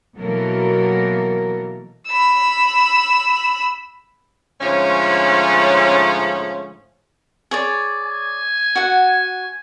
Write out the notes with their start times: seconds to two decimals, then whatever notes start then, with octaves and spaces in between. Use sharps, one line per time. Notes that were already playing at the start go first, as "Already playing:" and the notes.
0.17 B2 E3 F#3 A#3 A4 A#4
2.07 B5 E6
4.61 G#2 D3 F3 A3 C#4
7.51 G#4 C#5 D5
8.03 G#5
8.75 F#4 F#5